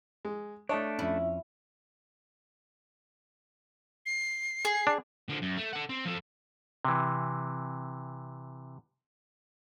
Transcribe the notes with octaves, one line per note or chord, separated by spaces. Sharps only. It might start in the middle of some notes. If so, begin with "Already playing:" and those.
G#3
A3 D4 C#5 D#5 A5
F2 C#4 E4
C7
G#4
D4
D3 F3
F#2
A3
A4 F#5
C4
F3 A4
C3 E3